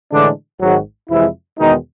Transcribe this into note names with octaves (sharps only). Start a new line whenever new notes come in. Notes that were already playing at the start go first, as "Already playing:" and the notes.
A2 D3 E3 G#3 D4
G#1 G#2 D#3 F#3 G#3 F#4
F2 C3 E3 F3 G#3 E4
E2 B2 D#3 G#3 B3 D#4